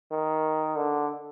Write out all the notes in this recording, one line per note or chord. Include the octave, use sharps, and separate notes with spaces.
D#3
D3